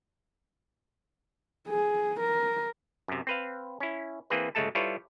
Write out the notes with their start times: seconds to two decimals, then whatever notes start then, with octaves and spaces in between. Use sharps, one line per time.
1.69 G#4
2.20 A#4
3.08 F#2 C3
3.27 C4 B4 F5
3.80 C#4 E4
4.30 E3 A#3 C4 G#4 B4
4.55 G1 C#3 G#3 A3 A4 A5
4.75 G3 E4 F4 A4 B4 C#5